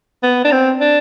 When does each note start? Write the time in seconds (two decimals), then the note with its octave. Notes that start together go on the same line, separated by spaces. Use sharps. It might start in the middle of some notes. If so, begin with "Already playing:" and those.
0.23 B3
0.44 D4
0.51 C4
0.80 D4